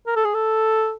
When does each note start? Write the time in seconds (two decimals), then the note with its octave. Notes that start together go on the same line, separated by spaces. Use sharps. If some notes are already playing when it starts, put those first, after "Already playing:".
0.07 A#4
0.16 A4
0.25 G#4
0.34 A4